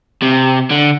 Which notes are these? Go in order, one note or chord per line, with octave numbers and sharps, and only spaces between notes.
C3
D3